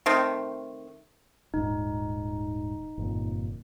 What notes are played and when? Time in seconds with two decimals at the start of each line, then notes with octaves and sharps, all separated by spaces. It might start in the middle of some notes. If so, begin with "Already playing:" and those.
0.06 D#3 A3 C4
1.54 D#1 G#2 D#4
2.98 G1 F2 A#2